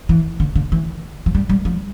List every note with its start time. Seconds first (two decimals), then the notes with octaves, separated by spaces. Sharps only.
0.09 E3
0.40 D3
0.55 D3
0.72 E3
1.26 F3
1.35 G3
1.49 G3
1.65 F3